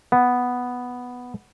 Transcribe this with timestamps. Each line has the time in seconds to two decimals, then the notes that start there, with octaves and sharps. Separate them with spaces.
0.12 B3